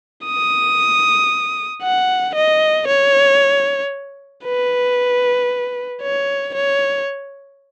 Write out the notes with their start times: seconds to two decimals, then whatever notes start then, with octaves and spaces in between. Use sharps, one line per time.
0.25 D#6
1.82 F#5
2.35 D#5
2.87 C#5
4.45 B4
6.02 C#5
6.55 C#5